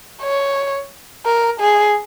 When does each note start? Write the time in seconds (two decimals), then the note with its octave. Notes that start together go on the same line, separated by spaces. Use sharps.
0.23 C#5
1.25 A#4
1.61 G#4